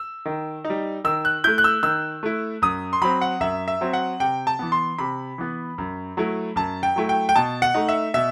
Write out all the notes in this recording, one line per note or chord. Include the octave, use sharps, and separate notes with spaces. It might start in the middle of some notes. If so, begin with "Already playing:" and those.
Already playing: E6
D#3
D#4
G3
D#3 E6
F#6
A3 E4 G6
F#6
E6
D#3 E6
A3 E4
F#2 D#6
C6
F#3 C4 B5
F#5
F#2 E5
E5
F#3 C4
F#5
C3 G5
A5
E3 B3
C6
C3 B5
E3 B3
F#2
F#3 A3 E4
F#2 A5
G5
F#3 A3 E4
G5
G5
B2 A5
F#5
A3 D#4
E5
B2 E5